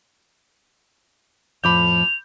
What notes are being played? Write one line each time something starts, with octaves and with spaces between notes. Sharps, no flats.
F2 A2 F3 B5 D6 G6 F7